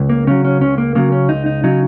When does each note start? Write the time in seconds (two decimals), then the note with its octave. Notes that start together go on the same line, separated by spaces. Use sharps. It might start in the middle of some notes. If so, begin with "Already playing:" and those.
Already playing: C#2
0.10 A#3
0.27 C#3 F#3 C#4
0.45 C#4
0.61 C#2 C#4
0.78 A#3
0.95 C#3 F#3 A#3
1.12 C#4
1.29 C#2 D#4
1.46 D#4
1.64 C#3 F#3 D#4